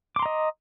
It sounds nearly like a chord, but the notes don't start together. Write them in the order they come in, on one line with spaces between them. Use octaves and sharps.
D6 C6 A#5 D#5